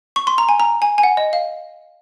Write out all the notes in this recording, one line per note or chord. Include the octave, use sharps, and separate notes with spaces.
C#6
C6
A#5
G#5
A#5
G#5
G#5
F#5
D#5
F5